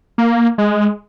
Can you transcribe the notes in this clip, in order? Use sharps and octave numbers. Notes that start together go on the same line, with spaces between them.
A#3
G#3